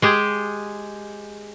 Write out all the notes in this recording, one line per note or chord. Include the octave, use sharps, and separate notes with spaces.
G#3 G4 G#4